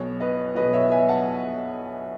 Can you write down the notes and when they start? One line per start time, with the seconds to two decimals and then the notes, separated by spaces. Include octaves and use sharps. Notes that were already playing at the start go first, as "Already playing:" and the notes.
Already playing: B1 B2 C#5
0.20 B4 D#5
0.55 B1 B4 D#5
0.59 B2
0.73 C#5 E5
0.91 E5 G#5
1.09 F#5 A5